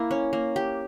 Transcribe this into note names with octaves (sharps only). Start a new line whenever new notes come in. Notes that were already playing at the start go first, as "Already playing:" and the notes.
Already playing: A#3 E4
C#4
A#3
G4